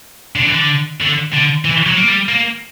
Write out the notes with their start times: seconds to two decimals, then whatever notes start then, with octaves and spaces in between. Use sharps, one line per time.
0.36 D3
0.46 E3
0.55 D3
1.01 D3
1.33 D3
1.65 E3
1.86 F#3
1.97 A#3
2.08 G3
2.29 A#3